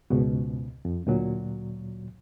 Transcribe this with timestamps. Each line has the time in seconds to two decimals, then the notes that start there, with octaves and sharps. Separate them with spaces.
0.10 C#2 G#2 B2
0.85 F2
1.07 D2 A#2 F#3